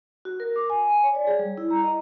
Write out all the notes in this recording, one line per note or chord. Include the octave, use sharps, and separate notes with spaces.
F#4
A#4
D6
G#5
G#5
C#5
D5
G#4
G3
E4
A#5
D#5